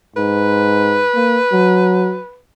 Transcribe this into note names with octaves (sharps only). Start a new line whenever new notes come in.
G#2 B4
A#3
F#3